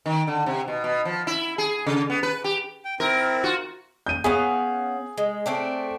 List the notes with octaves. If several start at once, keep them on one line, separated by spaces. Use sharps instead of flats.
D#3
D3
C3
B2
B2
F3
E4
G#4
C#3
B3
B4
G4
G5
C4 E4 A#4
F4 F#4
G6 D#7
B3 C#4 G#4 F5
G#3
A3 C4 D4